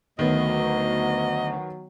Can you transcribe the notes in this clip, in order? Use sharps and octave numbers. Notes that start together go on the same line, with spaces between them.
D2 D#3 F#3 B3 D#5